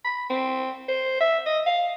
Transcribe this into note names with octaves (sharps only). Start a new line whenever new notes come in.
B5
C4
C5
E5
D#5
F5